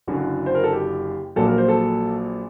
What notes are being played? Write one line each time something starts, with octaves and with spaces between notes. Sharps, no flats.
F#1 F#2 D3 F#3 F#4
C5
A#4
A4
G4
A#1 A#2 F#3 A4
A#4
C5
A4